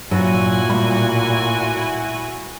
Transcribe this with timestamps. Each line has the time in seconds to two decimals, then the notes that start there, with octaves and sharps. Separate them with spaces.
0.11 G2 A#2 F#3 E4 F#4 G#5
0.70 A2 G3 B5